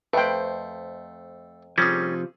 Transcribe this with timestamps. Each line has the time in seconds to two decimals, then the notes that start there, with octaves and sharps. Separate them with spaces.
0.13 F2 A3 B4 C5 G5
1.78 C3 F3 G3 C#4 G#4 A4